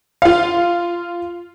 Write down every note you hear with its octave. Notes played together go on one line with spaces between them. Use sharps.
F4 F5